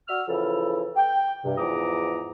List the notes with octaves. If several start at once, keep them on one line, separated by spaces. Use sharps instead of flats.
F#4 D5 E6 F6
C#3 E3 F3 E4 A4
G5
G2 C3
E2 G#2 F3 A#5 D6 D#6